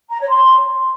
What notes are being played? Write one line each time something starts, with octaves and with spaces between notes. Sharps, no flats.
A#5
C#5
C6